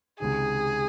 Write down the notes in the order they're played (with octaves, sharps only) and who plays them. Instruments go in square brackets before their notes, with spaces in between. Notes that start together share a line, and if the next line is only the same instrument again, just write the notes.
[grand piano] C#2 C3 D#3 [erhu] G#4